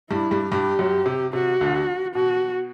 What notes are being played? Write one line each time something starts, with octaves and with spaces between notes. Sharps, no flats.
G2 G3 E4
G2 G3
G2 G3 G4
F#2 F#3
C3
C3 F#4
D2 D3
B2 F#4